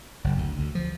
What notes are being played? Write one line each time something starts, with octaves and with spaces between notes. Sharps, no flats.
F#1
D2
D2
F3